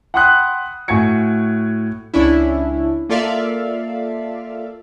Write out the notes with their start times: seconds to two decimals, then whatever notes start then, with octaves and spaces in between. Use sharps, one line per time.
0.14 F#5 G5 B5 C6 D#6 F#6
0.88 A2 F#4 G#5 G#6 C#7
2.14 C#2 C#4 D4 E4
3.09 A#3 F4 A4 D5 E5 F5